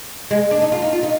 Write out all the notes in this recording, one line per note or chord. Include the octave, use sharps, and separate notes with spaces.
G#3
D4
D#4
F4
D#4
F4
D#4